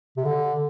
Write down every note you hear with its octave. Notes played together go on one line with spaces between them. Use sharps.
C3
D3